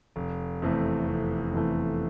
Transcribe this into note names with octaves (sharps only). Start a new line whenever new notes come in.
F1
E2 C3 E3 A3
F1
E2 C3 E3 A3